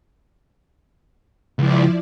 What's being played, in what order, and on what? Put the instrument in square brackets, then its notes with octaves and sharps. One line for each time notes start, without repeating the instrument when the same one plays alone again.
[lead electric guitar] C#2 [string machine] F3 E4 D5